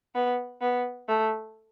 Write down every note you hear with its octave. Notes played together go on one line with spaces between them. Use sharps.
B3
B3
A3